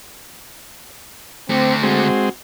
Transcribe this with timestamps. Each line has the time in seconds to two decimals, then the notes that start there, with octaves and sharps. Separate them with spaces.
1.50 D2 A3 C4
1.83 G#3 C4 F#4